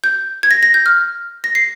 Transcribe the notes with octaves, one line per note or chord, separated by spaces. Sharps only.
G6
G#6
A#6
A#6
G6
F6
A#6
C7